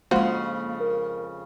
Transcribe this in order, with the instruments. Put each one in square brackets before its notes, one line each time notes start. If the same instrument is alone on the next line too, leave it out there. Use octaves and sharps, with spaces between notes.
[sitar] F2 C#3 [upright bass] G#3 D4 [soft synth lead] A#3 [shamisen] F4 F#4 C5
[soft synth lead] A#4